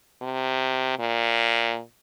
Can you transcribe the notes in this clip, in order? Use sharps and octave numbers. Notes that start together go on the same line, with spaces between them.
C3
A#2